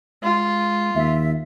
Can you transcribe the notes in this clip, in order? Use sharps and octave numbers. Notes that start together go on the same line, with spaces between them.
G#3 F4
D#2 E5